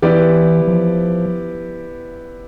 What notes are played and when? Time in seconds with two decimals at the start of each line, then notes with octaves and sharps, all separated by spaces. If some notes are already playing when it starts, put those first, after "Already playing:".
0.02 E3 B3 E4 G4 B4 D5
0.67 F3